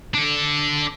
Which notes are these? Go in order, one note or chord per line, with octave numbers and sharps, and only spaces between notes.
D4 A4